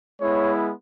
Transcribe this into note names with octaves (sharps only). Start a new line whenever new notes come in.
G#3 B3 E4 C#5